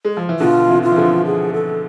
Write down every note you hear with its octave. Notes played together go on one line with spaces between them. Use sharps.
G#3
F3
E3
B2 D3 F4
C3 E3
F4
E3
D3 F3
G#4
A4